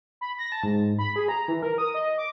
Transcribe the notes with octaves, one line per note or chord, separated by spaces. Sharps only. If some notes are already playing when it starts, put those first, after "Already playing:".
B5
A#6
A5
G#2
B5
G#4
A#5
E3
A#4
D#6
D#5
D6